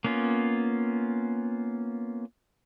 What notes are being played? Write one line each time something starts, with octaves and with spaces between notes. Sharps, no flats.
A#3 B3 C#4 F4